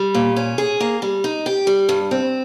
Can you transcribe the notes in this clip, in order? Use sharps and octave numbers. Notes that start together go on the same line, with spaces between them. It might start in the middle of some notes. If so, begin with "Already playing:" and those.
Already playing: G3
A#2
C#4
G#4
A#3
G3
D#4
G4
G3
G2
C4